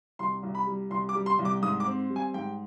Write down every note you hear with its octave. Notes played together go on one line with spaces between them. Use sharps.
C2 C6
C2
B5
G3
C2 C6
D6
G3
C6
C2
D6
G#2 D#6
D6
C4
G3
G#5
G#2 G5